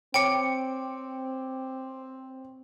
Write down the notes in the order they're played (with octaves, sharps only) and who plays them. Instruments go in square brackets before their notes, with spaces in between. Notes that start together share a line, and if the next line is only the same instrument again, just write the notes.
[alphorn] C4 [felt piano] C#5 D6 [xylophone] G5 C#7